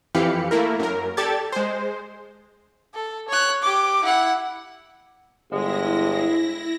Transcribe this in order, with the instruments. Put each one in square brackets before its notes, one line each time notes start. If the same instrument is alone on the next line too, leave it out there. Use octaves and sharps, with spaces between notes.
[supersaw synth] F2 E3 G4 F5 B5 C#7
A3 A#3 E4 A#4
F#2 A#4
G4 A4 D5 A5 G#6 A6
G#3 C5
[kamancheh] A4
C#5 F#6
G4 D6
E4 F#5
[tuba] G1 [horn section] G#3 [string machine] E4 A#6